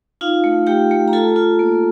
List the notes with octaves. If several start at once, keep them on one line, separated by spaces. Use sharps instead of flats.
D#4 F4 F5
A3
A3 G4 G5
A3
A#5
F4 A4 A5
F4
A#3